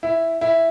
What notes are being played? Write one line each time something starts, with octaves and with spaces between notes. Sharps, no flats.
E4
E4